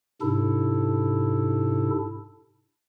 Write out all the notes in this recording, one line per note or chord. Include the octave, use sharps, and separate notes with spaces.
G#2 C3 D4 E4 A4